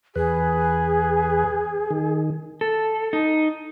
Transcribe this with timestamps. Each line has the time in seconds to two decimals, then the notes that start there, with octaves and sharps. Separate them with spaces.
0.16 E2 G#4 B4
1.90 D#3
2.61 A4
3.13 D#4